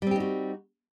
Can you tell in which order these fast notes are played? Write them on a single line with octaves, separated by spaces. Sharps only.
G3 C4 G4 D#4 F#4